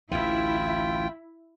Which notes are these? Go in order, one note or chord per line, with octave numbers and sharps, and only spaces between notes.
A1 D2 E3 E4 F4 G5